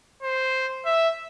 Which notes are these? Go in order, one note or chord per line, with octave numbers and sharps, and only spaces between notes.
C5
E5